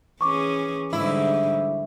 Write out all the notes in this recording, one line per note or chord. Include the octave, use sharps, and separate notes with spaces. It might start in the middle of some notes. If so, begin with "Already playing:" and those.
E3 C#4 G#4 C#6 D6
G#2 D3 G3 E4